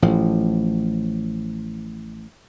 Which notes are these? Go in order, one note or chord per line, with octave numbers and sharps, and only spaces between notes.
A1 A2 F3